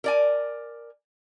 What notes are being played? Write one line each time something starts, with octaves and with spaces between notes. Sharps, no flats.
A#4 D5 G#5